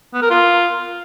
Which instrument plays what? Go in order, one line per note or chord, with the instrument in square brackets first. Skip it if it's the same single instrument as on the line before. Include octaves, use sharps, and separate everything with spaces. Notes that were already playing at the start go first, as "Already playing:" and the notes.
[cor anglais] B3
A#4
F4